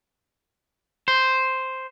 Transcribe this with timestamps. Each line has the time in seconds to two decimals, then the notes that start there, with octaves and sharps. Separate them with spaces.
1.08 C5